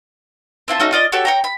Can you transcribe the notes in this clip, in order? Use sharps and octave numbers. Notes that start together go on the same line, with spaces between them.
C4 E4 F4 A5
A3 C#4 D#4 F#4
F4 D5 D#5
F#4 G4 A4 C#5
C#5 G5 A#5
B5